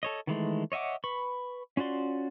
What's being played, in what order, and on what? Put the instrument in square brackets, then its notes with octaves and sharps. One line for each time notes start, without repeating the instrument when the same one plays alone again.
[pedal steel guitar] A4 C#5 D#5
D#3 E3 G#3 A3
C#5 D#5 E5 F#5 D6
B4 B5 C#6
C#4 F4 F#4 D5 C6